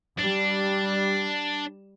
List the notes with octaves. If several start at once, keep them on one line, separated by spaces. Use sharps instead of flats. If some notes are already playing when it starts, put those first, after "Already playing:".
G3 D4